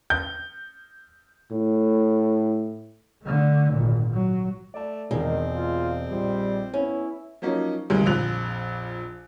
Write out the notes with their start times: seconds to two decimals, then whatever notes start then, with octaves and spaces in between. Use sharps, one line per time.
0.10 G6
1.51 A2
3.23 D3 A3
3.73 G#1 A#2
4.13 F#3
4.74 A3 D5 A5
5.11 E1 D#3 G#3 C4
5.55 F4
6.09 A#1 G3 C5
6.74 B3 C#4 E4
7.42 F3 F#3 A#3 C#4 D#4
7.90 D2 G2 C3 D#3 G#3
8.06 A#1 F2 F#6 F7